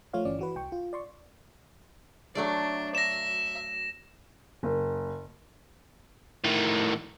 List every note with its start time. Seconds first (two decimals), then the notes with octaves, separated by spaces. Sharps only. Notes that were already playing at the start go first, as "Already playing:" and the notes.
0.13 F3 A3 F4 C#5 F5
0.25 G1 E3 C#4 D5
0.39 E3 F#4 B4
0.55 C2 G5 C#6
0.72 F4
0.93 D5 C6 C#6
2.35 F#3 A3 D4 D5
2.95 E5 A#6 E7
4.63 F#1
6.44 A2 D#3